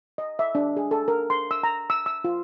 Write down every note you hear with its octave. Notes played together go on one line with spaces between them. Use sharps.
D#5
E5
D4
G#4
A4
A#4
C6
E6
A#5
E6
E6
F4